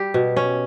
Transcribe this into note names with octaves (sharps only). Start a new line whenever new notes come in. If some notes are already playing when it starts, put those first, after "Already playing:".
Already playing: G3 G4
B2
C#4